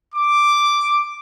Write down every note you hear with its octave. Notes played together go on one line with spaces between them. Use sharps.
D6